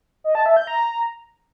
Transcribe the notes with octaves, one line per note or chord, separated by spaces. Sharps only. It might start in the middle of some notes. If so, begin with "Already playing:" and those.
D#5
A5
E5
G6
A#5